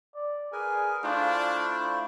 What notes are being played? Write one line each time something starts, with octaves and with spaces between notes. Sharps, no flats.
D5
G#4 A#4 B4 G#5
A3 D4 E4 F4 C5